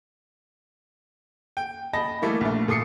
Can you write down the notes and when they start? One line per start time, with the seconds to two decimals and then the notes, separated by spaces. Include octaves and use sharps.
1.57 G5
1.93 D#5 A5 B5 A#6
2.22 E3 G3 A3 A#3 A4
2.41 A#1 A3
2.68 A#2 A4 D#6 C7 C#7